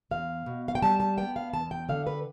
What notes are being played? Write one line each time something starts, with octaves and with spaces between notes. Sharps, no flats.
E2 F5
B2
F5
G5
G3 A5
A5
B3 G5
F5
E2 A5
G5
D3 F5
B4